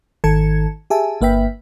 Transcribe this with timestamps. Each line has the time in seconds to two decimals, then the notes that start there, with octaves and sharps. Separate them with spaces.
0.24 G#1 D#3 A4 A5 G#6 C#7
0.90 G4 G#4 E5 G#5 A5
1.21 G1 A#3 B4 E5 G5 B6